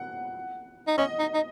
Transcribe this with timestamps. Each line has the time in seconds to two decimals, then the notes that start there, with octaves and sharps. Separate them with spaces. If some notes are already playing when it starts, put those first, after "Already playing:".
Already playing: F#5
0.87 D#4
0.98 C#4 D#5
1.19 D#4
1.34 D#4